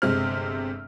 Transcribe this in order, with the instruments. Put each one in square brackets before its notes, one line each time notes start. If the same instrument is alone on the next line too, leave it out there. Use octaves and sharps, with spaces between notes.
[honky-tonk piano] G1 C3 G#3 C4 F6